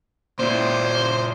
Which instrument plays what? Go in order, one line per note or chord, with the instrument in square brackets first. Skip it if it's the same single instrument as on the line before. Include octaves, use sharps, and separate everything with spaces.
[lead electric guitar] A#2 E4 [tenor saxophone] C5